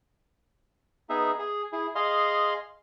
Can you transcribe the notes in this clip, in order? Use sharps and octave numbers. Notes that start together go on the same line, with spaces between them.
B3 D#4 G#4 E5
G#4
E4 G#4
G#4 D#5 F5 C6